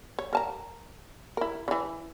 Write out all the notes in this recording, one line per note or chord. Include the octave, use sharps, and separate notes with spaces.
C#5
A#4 A5 A#5
E4 A#4
C#3 E3